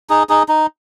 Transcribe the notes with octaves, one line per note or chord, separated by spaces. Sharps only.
D#4 G#4
D#4 G#4
D#4